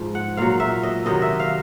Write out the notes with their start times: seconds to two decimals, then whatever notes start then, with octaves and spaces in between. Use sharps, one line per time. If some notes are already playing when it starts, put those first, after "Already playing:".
Already playing: G#2 F3
0.15 F#5
0.37 A#2 F#3 F5
0.60 E5
0.83 D#5
1.05 C3 D#3 F#3 D#5
1.22 E5
1.40 F5